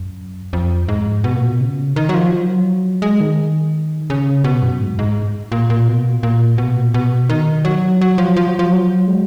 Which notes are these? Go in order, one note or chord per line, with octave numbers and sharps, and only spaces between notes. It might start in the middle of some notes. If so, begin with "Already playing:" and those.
Already playing: F#2
F2
G#2
B2
A#2
B2
C#3
D#3
F#3
F3
F#3
G#3
D#3
C#3
B2
F#2
G#2
G#2
A#2
A#2
B2
A#2
A#2
B2
A#2
B2
D#3
F#3
F#3
F3
F3
F#3
F3
F#3
G#3